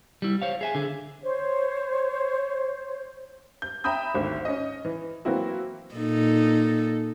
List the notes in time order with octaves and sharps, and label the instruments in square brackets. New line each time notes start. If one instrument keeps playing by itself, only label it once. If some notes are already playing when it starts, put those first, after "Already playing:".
[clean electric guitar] G3 E4
C5 C#5 F5
G#4 E5 G#5
D3 G#4
[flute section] C5 C#5
[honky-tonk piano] G6
E5 G5 A#5 B5 D#6 G6
G#1 D2 D3
C#4 D#5
E3
E3 F#3 A#3 C4 E4 F#4
[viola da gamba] A#2 D#4 A4